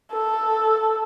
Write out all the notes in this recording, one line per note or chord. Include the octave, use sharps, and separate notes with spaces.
A4